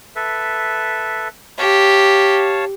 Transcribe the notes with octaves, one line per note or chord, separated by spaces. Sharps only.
A4 B4 E5
G4 C#5 F5 A5